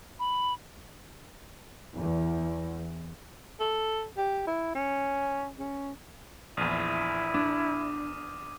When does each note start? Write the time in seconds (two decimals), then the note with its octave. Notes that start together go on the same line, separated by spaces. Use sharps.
0.20 B5
1.98 E2
3.60 A4
4.17 G4
4.47 E4
4.75 C#4
5.59 C#4
6.57 A#1 E2 E4 D#6 F6 D#7
7.34 D4 D6